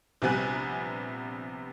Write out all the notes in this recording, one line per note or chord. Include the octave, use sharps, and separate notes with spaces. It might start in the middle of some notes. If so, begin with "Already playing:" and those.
A#1 C3 G3 B3 G#5 F#6